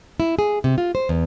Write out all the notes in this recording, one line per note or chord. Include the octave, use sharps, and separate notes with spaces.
E4
G#4
C3
F4
C5
E2